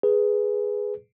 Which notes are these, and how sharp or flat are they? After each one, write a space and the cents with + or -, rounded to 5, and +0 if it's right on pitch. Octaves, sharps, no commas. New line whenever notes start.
G#4 +0 B4 +0